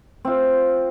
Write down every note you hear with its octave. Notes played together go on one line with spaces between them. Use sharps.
C4 F4